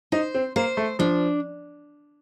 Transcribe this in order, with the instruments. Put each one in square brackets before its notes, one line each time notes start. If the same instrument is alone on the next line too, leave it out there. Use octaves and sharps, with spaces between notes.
[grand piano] D#4 [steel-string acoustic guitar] C5
[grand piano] C4
[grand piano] A#3 [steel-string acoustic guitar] C5
[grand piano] A3
[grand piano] F3 [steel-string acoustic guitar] D4